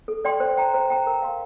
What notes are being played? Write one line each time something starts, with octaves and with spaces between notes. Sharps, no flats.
A4
D5 G5 C6
C5
G5 A#5
C5
G5 A#5
A#4
F5 C6